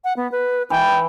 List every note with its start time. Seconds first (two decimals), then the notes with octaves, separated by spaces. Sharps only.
0.04 F#5
0.17 B3
0.32 B4
0.70 E3 G5